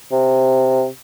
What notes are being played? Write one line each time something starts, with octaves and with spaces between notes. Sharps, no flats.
C3